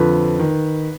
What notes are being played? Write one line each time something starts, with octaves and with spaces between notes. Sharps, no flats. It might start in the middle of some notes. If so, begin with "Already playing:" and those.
Already playing: F2 D3 F3 B4
D#3